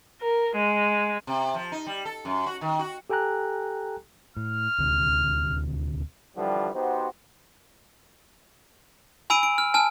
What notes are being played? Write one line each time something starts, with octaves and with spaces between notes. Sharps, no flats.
A#4
G#3
C3
F3
D#4
G3
A4
F#2
F#4
D#3
F#4
G4 A4 G5 G#5 A#5 F#6
A2 F6
D#1 D2 C3
D3 E3 F3 G3
B3 D#4 F#4 G4 C5
G#5 B5 E6 D7 D#7
D7
F6
G#5 A5 F6